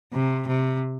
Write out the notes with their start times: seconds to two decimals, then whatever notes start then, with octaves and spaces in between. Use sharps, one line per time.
0.13 C3
0.47 C3